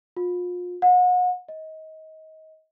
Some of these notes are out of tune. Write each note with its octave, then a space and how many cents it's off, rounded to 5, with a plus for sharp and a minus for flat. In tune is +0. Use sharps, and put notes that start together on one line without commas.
F4 +35
F#5 -35
D#5 +25